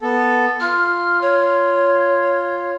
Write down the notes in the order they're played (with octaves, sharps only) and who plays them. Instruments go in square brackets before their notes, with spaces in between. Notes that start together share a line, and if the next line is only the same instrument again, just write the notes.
[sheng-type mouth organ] B3 A4
[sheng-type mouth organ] F4 [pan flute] F6
[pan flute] C#5